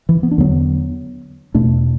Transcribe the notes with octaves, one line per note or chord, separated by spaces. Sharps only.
E3
B3
D4
E2 D3 F#3 B3
E2 B2 A3 D4